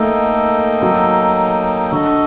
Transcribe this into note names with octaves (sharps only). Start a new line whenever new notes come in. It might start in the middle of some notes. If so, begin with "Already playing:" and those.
Already playing: A3 A#3 D#4 A4 D#5 G5
F#3
D3 F#4 A4 D#5